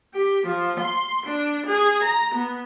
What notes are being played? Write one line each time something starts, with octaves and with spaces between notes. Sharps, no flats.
G4
F3
C6
D4
G#4
A#5
B3